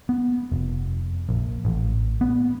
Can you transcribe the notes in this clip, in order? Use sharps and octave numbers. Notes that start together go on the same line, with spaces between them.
B3
F1
A#1
A1
B3